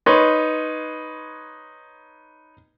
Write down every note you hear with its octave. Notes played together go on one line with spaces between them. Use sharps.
D#4 B4 C#5 C6